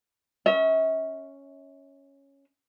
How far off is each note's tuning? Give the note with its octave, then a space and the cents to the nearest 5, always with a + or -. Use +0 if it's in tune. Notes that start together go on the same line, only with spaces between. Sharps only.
C#4 +0 E5 -40